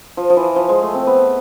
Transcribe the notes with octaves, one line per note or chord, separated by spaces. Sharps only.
F3
F3
E3
F3
G#3
A3
C4
B3